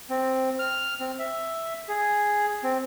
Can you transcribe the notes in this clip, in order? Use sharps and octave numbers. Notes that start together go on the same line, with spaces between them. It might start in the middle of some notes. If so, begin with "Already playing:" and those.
C4
F6
C4
E5
G#4
C4